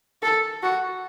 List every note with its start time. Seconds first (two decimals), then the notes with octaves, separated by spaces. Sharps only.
0.22 A4
0.63 F#4